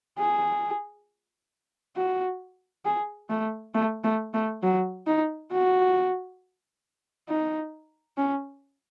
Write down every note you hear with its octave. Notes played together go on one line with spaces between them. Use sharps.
G#4
F#4
G#4
A3
A3
A3
A3
F#3
D#4
F#4
D#4
C#4